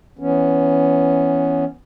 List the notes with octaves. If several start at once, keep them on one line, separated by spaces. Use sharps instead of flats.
E3 B3 C#4